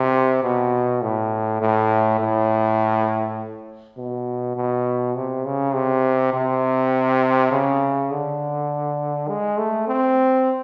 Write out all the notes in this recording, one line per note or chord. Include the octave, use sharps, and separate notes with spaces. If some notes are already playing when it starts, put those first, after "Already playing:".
Already playing: C3
B2
A2
A2
A2
B2
B2
C3
C#3
C3
C3
C#3
D3
G#3
A3
C4